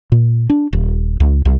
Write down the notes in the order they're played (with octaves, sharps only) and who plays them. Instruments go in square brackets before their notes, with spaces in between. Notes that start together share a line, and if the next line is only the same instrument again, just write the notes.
[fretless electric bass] A#2
D4
D#1
C#2
C2